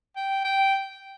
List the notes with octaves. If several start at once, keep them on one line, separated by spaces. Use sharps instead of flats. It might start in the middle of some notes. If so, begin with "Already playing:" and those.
G5
G5